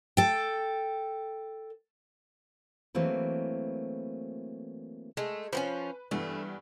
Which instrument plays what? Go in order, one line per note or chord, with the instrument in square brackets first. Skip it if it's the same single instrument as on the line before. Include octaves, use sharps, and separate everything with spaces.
[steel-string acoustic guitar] A4 G5
E3 F#3 A3 A#3 C4 B4
[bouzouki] G#3 A3
[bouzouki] F3 A3 C#4 [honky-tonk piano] B4
[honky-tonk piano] G2 E3 B3 [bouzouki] A3